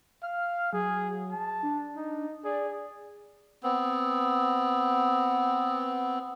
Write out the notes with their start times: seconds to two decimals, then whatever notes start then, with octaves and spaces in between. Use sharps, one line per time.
0.22 F5 F6
0.73 F#3 G#4
1.31 A5
1.62 D4
1.96 D#4
2.44 G#4 D5
3.63 B3 C4